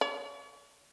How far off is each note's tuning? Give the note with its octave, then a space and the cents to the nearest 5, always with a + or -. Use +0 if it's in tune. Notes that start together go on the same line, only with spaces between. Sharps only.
C#5 +40